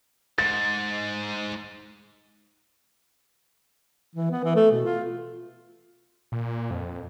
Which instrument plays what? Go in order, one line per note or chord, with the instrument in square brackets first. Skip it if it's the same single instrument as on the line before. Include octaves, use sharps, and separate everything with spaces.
[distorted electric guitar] G#2 [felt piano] A6
[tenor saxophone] E3
B3
E3
A3
B2
F4
[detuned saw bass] A#2
F2